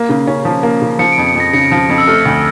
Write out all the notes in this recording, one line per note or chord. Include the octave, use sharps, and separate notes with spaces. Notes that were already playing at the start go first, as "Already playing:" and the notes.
Already playing: A#3
C#3
C#4
F3
A#3
C#3
F3 C#7
D7
F2
C#7
F2 A#6
A#6
C#3 C#7
F3
F2
E6
A3 F6
D2